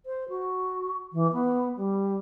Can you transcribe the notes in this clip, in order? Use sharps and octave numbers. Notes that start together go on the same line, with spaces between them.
C5
F#4
E3
B3
G3